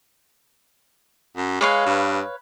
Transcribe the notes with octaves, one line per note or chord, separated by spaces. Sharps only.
F#2
G#3 B4 C#5 F5
G2